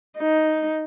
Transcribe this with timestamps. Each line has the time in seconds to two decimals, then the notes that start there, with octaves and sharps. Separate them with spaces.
0.18 D#4